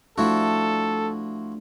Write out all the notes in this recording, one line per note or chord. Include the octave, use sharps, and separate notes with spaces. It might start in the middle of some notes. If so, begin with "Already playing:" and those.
F3 A3 D4 E4 F#4 A4